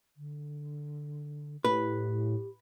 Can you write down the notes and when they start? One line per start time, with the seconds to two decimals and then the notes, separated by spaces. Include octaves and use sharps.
0.17 D3
1.65 A2 G4 B4